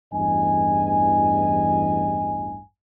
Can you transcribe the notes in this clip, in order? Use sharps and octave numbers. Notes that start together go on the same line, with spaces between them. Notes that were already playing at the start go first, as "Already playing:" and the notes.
A1 E2 G2 D#5 G#5